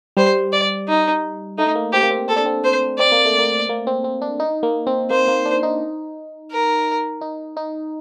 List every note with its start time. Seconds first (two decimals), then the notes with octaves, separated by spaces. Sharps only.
0.17 G3 C5
0.52 D5
0.88 D#4
1.58 A3 D#4
1.76 A#3
1.93 C4 G4
2.03 A#3
2.11 C4
2.28 C4 A4
2.36 D4
2.46 C4
2.64 C5
2.98 C4 D5
3.12 A#3
3.26 A3
3.39 A#3
3.69 A#3
3.87 C4
4.04 C4
4.22 D4
4.40 D#4
4.63 A#3
4.87 C4
5.10 A#3 C5
5.28 A#3
5.45 D4
5.63 D#4
6.52 A#4
7.21 D#4
7.57 D#4